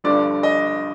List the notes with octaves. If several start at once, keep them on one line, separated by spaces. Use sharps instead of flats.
G1 G2 D3 F3 D5
D#5